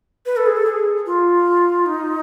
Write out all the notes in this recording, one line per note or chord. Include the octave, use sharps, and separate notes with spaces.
B4
A4
G#4
A4
G#4
F4
D#4